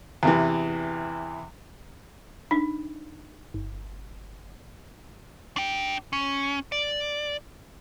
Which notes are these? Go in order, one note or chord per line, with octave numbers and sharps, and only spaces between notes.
E2 C3 E3
D4 D#4
G1
D4 G5
C#4
D5